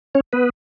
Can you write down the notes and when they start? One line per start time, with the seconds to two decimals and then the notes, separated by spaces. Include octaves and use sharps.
0.15 C#4 C#5
0.33 B3 B4